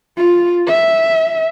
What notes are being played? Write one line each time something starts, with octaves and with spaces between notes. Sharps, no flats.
F4
E5